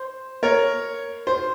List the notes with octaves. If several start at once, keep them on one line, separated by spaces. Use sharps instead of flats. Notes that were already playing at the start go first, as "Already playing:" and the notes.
Already playing: C5
A#4 C#5
C5